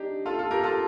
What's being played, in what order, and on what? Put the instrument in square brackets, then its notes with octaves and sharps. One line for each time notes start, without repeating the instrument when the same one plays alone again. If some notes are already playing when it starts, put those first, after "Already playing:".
Already playing: [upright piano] D4 D#4 G4
F4 A4
F4 A4
G4 A#4
F4 A4